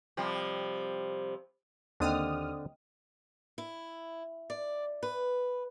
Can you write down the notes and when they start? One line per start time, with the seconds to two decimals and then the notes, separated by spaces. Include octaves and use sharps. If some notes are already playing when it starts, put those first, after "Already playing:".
0.17 C3 F3 G3
2.00 D#2 D3 C4 D4 D#5 G5 D#6 F6
3.58 E4
4.50 D5
5.03 B4